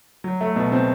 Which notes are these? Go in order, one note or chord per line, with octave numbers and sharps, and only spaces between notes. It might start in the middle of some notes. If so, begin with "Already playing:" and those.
F#3
A3
B2
C4